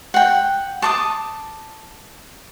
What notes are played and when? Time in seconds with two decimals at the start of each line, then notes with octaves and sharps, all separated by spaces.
0.14 F#5 G5
0.82 A5 D6 D#6